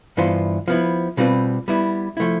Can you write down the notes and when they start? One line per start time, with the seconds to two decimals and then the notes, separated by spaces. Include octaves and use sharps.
0.17 G2 E3 B3 F4 C5
0.68 F3 B3 E4
1.17 B2 G3 C4 F4 B4
1.68 G3 B3 E4
2.17 F3 A3 E4